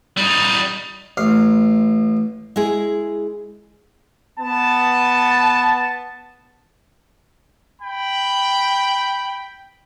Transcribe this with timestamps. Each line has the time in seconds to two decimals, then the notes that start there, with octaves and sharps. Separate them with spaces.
0.17 G3 D#4
1.17 A1 F5
2.56 G#3 E4 G#4
4.39 B3 A5
7.82 G5 B5